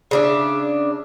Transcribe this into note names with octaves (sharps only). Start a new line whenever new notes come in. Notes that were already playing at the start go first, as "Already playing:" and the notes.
C#3 D4 E5